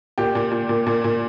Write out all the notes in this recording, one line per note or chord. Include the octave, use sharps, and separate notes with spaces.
A#2 G4
A#2
A#2
A#2
A#2
A#2